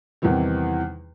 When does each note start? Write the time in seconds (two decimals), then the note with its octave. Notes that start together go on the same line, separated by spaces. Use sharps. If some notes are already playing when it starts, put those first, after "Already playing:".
0.22 E2 C3 D#3 E3 G3